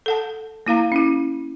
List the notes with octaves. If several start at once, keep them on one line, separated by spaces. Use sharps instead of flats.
A4 F#5 A5
A#3 E4 F5 A#5
C#4 E4